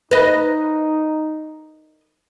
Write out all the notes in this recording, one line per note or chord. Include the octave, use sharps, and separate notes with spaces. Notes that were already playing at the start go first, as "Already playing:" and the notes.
D#4 B4 D#5